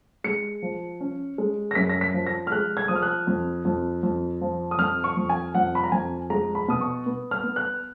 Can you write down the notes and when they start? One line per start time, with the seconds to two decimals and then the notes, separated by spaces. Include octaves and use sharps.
0.24 G#3 C#7
0.62 F3
1.01 C#4
1.38 G#3
1.71 A#6
1.75 F#2 B6
1.89 A#6
2.01 B6
2.14 F3
2.27 A#6
2.47 F6
2.51 G#3 F#6
2.77 G#6
2.88 F3 D#6
2.95 F6
3.02 F#6
3.27 F2
3.65 F2
4.03 F2
4.41 F3
4.71 D#6
4.79 F2 F6
5.04 C#6
5.17 F2
5.29 G#5
5.55 F2 F#5
5.75 B5
5.83 A#5
5.92 F2 G#5
6.30 G#3 A#5
6.55 B5
6.68 B2 D#6
6.81 C#6
7.06 B3
7.31 F6
7.44 B3
7.56 F#6